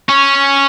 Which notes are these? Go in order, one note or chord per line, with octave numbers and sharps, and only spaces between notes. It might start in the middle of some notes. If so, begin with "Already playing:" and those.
C#4